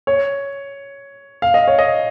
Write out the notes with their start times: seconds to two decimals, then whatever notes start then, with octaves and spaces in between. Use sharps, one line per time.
0.07 C#5
1.42 F5
1.54 D#5
1.68 C#5
1.79 D#5